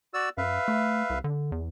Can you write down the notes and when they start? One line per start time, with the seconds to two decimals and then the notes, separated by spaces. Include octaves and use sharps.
0.14 F#4 D5 E6
0.38 F#2 B4 E5 F5
0.68 A3
1.10 C2
1.24 D3
1.52 E2